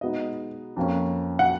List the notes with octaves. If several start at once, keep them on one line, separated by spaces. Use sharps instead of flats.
B2 G#3 B3 D#4 D#5
F2 F3 A#3 C#4
F#5